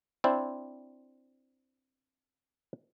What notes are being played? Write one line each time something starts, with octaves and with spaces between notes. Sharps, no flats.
C4 D4 E4 C5 D5